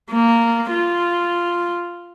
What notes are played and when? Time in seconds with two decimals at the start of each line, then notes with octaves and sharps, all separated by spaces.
0.12 A#3
0.71 F4